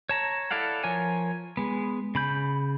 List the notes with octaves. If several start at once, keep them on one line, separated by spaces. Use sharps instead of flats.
C#5 A5 A#5
E4 A4 D5 F5 F#5
F3 A#4 C#5 G#5
G#3 B3
C#3 B5 G6